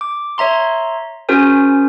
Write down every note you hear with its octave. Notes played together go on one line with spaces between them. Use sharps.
D6
C#5 E5 A#5 C6
C#4 F#4 G#4 A#4 C5 G#5